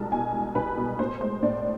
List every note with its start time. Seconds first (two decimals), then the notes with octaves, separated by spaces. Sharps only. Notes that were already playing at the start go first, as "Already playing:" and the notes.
Already playing: C2 B2 G#3 A5
0.12 B2 G#5
0.34 G#3
0.55 C2 B4
0.77 B2
0.99 A2 C5
1.21 G#3 C5
1.43 A2 D5